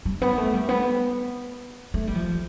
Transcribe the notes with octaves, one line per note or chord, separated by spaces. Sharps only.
G3
B3
A3
G3
B3
A3
G3
F3